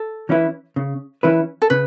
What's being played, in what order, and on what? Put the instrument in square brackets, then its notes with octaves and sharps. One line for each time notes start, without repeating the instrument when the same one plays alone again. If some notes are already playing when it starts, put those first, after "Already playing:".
Already playing: [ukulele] A4
[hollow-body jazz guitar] E3 C#4 E4 B4
C#3
E3 C#4 E4 B4
[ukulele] A4
[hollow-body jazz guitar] C#3 [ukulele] B4